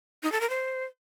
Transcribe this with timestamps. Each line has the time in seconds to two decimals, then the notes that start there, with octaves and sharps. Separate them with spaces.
0.23 D#4
0.32 A4
0.41 A#4
0.50 C5